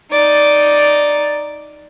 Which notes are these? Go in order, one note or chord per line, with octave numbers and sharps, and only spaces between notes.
D#4 D5